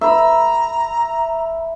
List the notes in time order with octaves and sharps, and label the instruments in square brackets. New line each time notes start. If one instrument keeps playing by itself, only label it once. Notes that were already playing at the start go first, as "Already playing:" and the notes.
[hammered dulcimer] E5 B5 [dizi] A#5